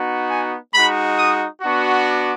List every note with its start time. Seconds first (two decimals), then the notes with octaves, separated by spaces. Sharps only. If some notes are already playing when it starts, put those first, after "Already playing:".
Already playing: B3 D#4 F#4
0.28 G#5
0.73 G#3 D#4 F#4 B5
1.17 D#6
1.61 B3 D4 F#4
2.06 D6